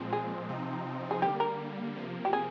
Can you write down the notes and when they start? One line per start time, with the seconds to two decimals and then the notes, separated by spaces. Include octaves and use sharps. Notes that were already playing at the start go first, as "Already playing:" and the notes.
Already playing: A#2 F3 G#3 C4
0.13 G#4
0.49 C3 F3 C4 D#4
1.11 G#4
1.22 D3 G3 A#3 G4
1.40 A#4
1.96 C3 F3 A#3
2.25 G4
2.33 G#4